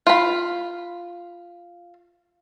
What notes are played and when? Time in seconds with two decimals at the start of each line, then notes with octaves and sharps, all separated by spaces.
0.07 F4 B5